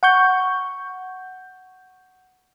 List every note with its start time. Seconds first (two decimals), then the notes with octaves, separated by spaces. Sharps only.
0.03 F#5 C#6 G6